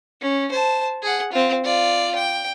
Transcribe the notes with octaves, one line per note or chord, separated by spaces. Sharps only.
C#4
C5 A5
G#4 F#5
C4 F4
F4 D5
G5